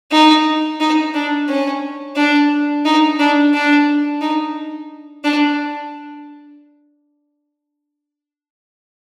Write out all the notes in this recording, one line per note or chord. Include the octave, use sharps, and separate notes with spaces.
D#4
D#4
D4
C#4
D4
D#4
D4
D4
D#4
D4